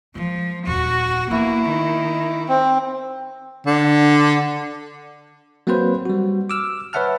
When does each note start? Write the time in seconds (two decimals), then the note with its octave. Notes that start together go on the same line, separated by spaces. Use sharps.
0.15 F3 G#3 A#3
0.67 D#1 F2 F#4
1.31 A#3 B3 E4
1.67 D#3
2.48 C4
3.66 D3
5.67 F#3 A#3 C4 F#4 B4 C5
6.06 G3 F#4
6.50 D6 E6 F6
6.93 B4 C#5 E5 F#5 A5 F6